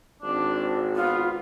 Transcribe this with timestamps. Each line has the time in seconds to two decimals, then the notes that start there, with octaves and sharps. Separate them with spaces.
0.22 G#1 D4
0.96 B3 F4